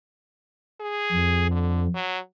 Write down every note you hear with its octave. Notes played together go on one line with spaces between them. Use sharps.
G#4
F2
D3
F#3